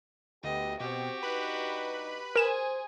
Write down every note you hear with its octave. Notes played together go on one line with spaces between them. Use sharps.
D2 B3 G4 D#5
B2 C4 F#4 G4
G2 D#4 B4 B5
G#4 A#4 C5 G#5 E7